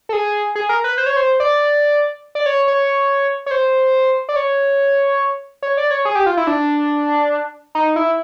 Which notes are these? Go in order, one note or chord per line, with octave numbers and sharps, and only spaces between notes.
A4
G#4
G#4
A#4
B4
C5
C#5
C5
D5
D5
C#5
C#5
C#5
C5
D5
C#5
C#5
D5
C#5
G#4
G4
F4
E4
D4
D#4
E4